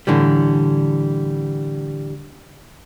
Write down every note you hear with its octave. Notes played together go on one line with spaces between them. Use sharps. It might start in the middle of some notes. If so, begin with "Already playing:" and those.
A2 D3 E3 G3